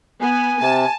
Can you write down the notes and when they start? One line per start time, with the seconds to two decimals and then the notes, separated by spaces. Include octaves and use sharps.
0.21 B3 G#5
0.62 C3 A5